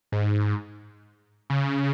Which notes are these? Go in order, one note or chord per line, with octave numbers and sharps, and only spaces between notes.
G#2
C#3